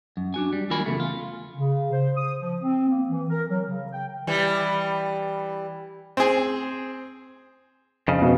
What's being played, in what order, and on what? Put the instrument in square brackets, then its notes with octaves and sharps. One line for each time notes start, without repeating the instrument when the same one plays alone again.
[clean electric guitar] F#2
D4 F#4 G#5
G3
D#2 F#3 F4 A#4 G#5 B5
E2 C#3 A3
F4
[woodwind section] C#3
C5
D#6
F3
C4
A#3
E3
A#4
F#3
C#3
G5
[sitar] E3 G3
[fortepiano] C4 G#4
[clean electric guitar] F2 C#3
[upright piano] B2